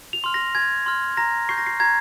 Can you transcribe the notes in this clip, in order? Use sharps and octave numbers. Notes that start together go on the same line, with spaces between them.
F7
C6 F6
A#6
G#5 G#6
C6 F6
A#5 A#6
C#6 G6 C7
A#6
C7
A#5 G#6